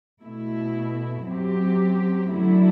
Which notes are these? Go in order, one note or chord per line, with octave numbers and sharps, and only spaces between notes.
B2 A3 E4
F#2 F#3 C4 G4
F#2 D3 F#3 A3 E4